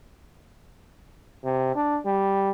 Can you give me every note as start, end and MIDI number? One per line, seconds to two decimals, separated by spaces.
1.44 1.74 48
1.75 1.98 62
2.06 2.51 55